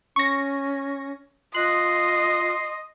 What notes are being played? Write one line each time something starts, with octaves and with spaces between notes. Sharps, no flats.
C#4 C#6 A#6
F4 D#5 C6 F#6